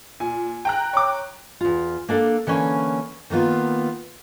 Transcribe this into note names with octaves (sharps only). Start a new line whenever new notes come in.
A#2 G#5
G5 A#5 F#6
C#5 D6
E2 F4
A#3 D4 A4 F5
D3 E3 A#3 C#4
D#3 A#3 B3 F4